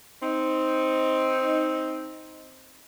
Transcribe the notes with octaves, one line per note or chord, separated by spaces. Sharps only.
C4 D#4